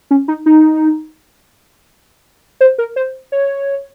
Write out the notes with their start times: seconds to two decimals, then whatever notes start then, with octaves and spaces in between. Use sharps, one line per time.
0.11 C#4
0.28 D#4
0.46 D#4
2.61 C5
2.78 A#4
2.96 C5
3.32 C#5